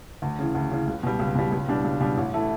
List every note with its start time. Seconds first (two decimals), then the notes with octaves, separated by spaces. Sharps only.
0.22 D2
0.39 C#3 E3
0.55 D2
0.71 C#3 E3
0.87 C#2
1.03 B2 G3
1.19 C#2
1.35 B2 G3
1.52 C#2
1.68 B2 G3 D4
1.84 C#2
2.00 B2 G3 D4
2.17 A1
2.33 E3 A3 E4